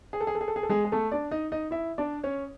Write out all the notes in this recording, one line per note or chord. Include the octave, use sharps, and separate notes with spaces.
G#4
A4
G#4
A4
G#4
A4
G#4
A4
G#3 G#4
G#4
A3 A4
D4 D5
D#4 D#5
D#4 D#5
E4 E5
D4 D5
C#4 C#5